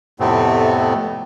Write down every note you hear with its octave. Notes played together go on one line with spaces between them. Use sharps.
F2 A2 C3 A3 B3 C4